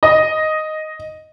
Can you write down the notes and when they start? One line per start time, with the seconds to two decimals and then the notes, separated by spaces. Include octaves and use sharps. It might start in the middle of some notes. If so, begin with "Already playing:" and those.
0.03 D#5